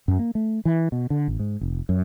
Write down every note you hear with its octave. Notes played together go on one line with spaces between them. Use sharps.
F#2
A#3
A3
E3
B2
D3
A1
G#2
F1
F#2